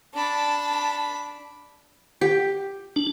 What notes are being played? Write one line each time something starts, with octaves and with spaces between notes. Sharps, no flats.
D4 A5 B5
G4
D4